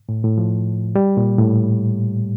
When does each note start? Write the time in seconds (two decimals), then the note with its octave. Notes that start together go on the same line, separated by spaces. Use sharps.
0.09 A2
0.24 A2
0.38 F3
0.96 G3
1.17 A#2
1.38 A2